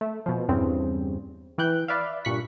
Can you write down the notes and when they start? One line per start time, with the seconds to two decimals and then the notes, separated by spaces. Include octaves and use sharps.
0.01 A3
0.26 B2 F3
0.48 E2 G2 C#3 C4
1.58 E3 G5 F#6 G6
1.88 B4 D5 E5 F5
2.25 G2 A#2 C#6 F#6 B6